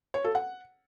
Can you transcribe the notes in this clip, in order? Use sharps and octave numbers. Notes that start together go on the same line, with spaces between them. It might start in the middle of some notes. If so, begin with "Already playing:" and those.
C#5
A4
F#5